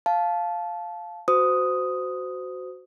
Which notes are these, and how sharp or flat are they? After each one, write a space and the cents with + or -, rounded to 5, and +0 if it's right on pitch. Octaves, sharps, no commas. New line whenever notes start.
F5 +0 A5 -15
F#4 +0 C5 -25 D#6 +0